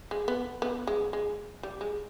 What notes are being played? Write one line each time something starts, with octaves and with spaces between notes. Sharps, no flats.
G#3
B3
B3
G#3
G#3
G3
G#3